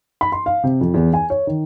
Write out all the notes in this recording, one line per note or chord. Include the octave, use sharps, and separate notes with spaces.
B5
C6
F5
C3
F2
E2
G#5
C#5
D#3